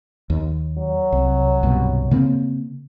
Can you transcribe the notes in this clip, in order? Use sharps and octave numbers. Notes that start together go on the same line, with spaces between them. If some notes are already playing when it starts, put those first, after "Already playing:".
D#2
F#3
C2
C2 G2 B2
C#3 A#3 C4